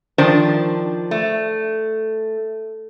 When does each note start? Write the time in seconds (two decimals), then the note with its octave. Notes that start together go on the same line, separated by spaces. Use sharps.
0.18 D#3 F3 D4 C5
1.11 A3